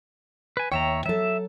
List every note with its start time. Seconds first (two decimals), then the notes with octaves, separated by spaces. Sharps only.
0.57 B4 G#5
0.72 D#2 C#5 E5 G5 A#5
1.06 F#3 A4 E5